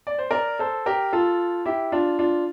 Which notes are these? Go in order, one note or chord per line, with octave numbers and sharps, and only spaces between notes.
D5
C5
A#4 D5
A4 C5
G4 A#4
F4 A4
E4 G4
D4 F4
D4 F4